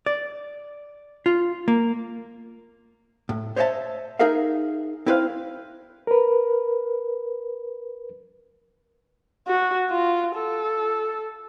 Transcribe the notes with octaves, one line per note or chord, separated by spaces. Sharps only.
D5
F4
A#3
A2
C5 C#5 D#5 E5 G5 A5
D#4 G#4 A#4 E5 F5
C4 E4 B4 C5 D5 F5
A#4 B4
F#4
F4
A4